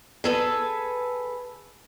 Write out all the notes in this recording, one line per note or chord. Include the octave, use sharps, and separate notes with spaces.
G#4 A4 B4